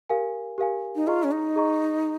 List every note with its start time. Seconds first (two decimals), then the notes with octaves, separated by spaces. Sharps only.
0.10 G4 A#4 F5 G#5
0.58 G4 A#4 F5 G#5
0.95 D#4
1.07 F4 G#4 D#5 A#5 C#6
1.24 C#4
1.32 D#4
1.56 G#4 D#5 A#5 C#6